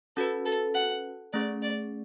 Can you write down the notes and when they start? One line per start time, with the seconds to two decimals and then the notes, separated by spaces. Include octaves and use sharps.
0.16 C#4 F#4 A4 B4
0.45 A4
0.74 F#5
1.33 A3 C#4 G#4 D5
1.62 D5